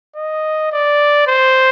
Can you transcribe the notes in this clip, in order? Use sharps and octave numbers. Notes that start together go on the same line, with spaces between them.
D#5
D5
C5